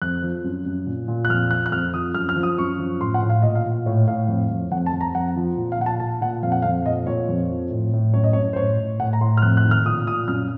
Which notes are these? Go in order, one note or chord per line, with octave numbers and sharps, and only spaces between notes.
F2 F#6
F3
F#2
F#2
A#2
A#2
F#6
F2 F6
F3 F#6
F#6
F2 F6
F3 D#6
F#2 F6
F6
F3
D#6
F#2 C#6
F3
A2 C6
F#5
A2
F5
A#2 D#5
F5
A#2
A2 C#5
A2 F5
F2
F2
F2 F#5
A5
F2
A#5
F2 F#5
F3
A#2
F5
A#2 F#5
A5
A#2 A5
A#2 F#5
F2 F5
F#5
F2 F5
A#2 D#5
A#2 C#5
F2
F3
A2
A2
F#2 C#5
D#5
F#2 C#5
C5
A2 C#5
A2
A2 F#5
A#5
A2 C6
F6
F2 F#6
F#6
D#3
F6
A#2 D#6
A#2 D#6
F#2 F6